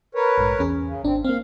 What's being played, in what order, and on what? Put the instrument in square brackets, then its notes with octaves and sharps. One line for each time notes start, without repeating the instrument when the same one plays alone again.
[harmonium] A#4 B4 C#5
[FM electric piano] A#1 G#2
E2 C#4 G#4
[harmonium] C#3
[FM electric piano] G#1 D4 [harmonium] C4
[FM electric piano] A#3 C4 [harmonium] F5